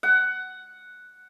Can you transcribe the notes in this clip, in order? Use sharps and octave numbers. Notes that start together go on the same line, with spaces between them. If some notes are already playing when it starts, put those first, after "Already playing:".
F#5